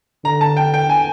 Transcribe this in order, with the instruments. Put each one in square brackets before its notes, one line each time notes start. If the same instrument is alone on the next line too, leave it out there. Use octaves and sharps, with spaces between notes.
[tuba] D3 [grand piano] A#5
[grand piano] A5
G5
G5
G#5